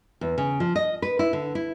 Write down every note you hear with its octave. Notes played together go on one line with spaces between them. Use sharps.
E2
C#3
F3
D#5
B4
E4
D3
E4